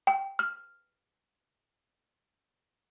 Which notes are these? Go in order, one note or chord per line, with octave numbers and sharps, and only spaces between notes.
G5
F6